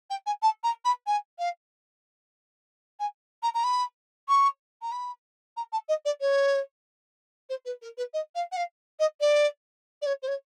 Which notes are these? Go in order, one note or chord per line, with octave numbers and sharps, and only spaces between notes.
G5
G#5
A5
A#5
B5
G#5
F5
G#5
A#5
A#5
B5
C#6
A#5
B5
A#5
A5
D#5
D5
C#5
C5
B4
A#4
B4
D#5
F5
F#5
F5
D#5
D5
D5
C#5
C5
C#5